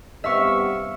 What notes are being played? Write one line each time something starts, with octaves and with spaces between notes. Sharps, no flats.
G2 C3 B3 E5 F5 C#6